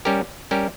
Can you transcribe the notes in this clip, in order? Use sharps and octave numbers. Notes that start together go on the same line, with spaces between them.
G3 C#4 G4 A#4
G3 C#4 G4 A#4